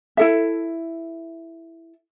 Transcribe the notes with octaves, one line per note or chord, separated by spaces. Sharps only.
E4 A4 E5